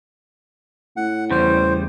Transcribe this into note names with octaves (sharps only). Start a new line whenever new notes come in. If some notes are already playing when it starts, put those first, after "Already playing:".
A2 F#5
E2 C#3 G3 C5